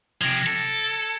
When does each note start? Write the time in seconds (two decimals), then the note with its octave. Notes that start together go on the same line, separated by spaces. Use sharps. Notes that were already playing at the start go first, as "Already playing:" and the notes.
0.21 C3 F3 G#6 A#6 D7
0.47 A4